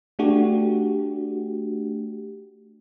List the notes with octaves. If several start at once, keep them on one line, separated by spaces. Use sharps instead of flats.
A3 D4 F#4 G4